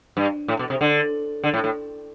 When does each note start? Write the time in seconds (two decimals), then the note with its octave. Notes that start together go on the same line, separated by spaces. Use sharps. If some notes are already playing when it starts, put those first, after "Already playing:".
0.17 G2
0.48 A2
0.59 B2
0.70 C3
0.81 D3
1.44 D3
1.54 A2
1.64 A2